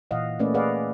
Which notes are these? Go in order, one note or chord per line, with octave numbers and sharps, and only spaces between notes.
A#2 E3 D#5 F5 F#5
A3 A#3 C#4 B4 D5 D#5
G#4 B4 D5 D#5 F5 F#5